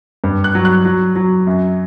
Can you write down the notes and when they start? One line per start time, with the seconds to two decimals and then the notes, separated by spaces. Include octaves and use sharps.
0.24 G2
0.44 F#6
0.55 F#3
0.65 F#6
0.85 F#3
1.16 F#3
1.47 F#2